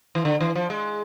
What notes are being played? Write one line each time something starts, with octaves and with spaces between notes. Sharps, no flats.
E3
D3
E3
F3
G#3